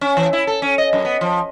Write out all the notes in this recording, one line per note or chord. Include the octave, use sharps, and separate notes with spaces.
C#4
E3
E4
A4
C#4
D#5
F#2
B3
F3